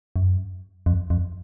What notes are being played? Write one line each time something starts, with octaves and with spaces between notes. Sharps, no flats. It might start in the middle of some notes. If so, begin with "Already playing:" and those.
F#2
F2
F2